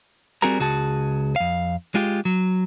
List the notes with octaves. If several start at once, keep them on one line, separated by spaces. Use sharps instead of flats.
G3 C4 F#4 G#4 A#4 A#5
C#2 F#4 G#4 A5
F2 F5
G#3 F4 G4
F#3